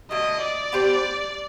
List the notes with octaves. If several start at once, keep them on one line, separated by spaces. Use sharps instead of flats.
D3 F#3 A3 D#5
D5
B3 D4 G4 C5